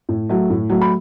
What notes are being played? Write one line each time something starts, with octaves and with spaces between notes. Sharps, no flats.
A2
F#3 A3
A2
F#3 A3
B5